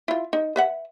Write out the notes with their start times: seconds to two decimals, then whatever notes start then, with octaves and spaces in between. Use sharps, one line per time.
0.08 E4 F4
0.33 D#4
0.56 B4 E5 F#5